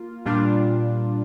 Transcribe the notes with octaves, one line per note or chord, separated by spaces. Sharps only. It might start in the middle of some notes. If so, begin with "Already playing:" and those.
Already playing: A#3 F4
A#2 G3 D4 F4